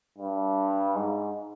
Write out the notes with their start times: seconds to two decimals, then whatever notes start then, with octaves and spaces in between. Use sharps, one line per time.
0.18 G2
0.96 G#2